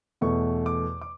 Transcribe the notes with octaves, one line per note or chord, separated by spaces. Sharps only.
E2 B2 A3 C#6
D6
D6